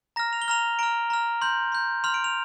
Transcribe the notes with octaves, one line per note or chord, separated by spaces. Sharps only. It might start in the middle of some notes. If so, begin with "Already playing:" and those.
A#5 F6 A#6
F7
G7
A#5 F6 F7
A#5 F6 D7
A#5 F6
C6 G6
C6 G6
C6 F6 F7
D7
F7